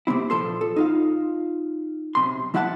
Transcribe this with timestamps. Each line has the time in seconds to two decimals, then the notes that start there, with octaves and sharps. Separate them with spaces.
0.07 C3 A#3 C4 E4
0.30 A#2 F3 A4 C6
0.61 A4
0.76 D#4 F4 F5
2.15 B1 C3 C6
2.54 F3 E4 E5 F#5 G5 A5